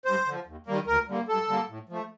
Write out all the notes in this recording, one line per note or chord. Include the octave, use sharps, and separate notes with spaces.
G2 C5
D3 F3
D#2
D#3 G3 A#3
D2 A#4
D3 G3 A#3
G2 A4
D3 G3 A#3
A2
F3 A3